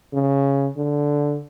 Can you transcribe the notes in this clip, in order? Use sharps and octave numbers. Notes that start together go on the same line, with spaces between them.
C#3
D3